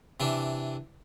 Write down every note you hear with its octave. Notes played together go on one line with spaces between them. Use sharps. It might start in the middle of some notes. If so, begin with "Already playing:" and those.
C3 E3 D4